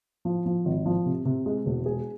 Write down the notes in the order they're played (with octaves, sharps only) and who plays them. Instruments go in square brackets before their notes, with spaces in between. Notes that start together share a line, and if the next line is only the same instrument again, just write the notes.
[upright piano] F3
F3
G#1
F3
C3
C3
G#3
E1
G#4